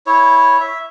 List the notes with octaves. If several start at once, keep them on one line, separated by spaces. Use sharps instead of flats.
E4 C#5
E5